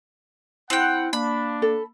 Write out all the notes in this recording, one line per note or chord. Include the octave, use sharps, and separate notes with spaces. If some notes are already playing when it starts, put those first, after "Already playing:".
C4 E4 F#5 G5
A#3 D4 B5
A4